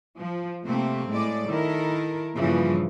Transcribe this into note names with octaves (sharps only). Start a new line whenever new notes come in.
F3
C3 A3 A#3 C4
A2 G#3 D5
D#3 E4 A4 A#4
G2 A#2 C#3 E3 F3